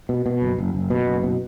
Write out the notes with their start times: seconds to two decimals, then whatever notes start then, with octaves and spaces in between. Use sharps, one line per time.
0.09 B2
0.26 B2
0.42 F#1
0.58 F#1
0.75 F#1
0.90 B2
1.07 F#1
1.23 B2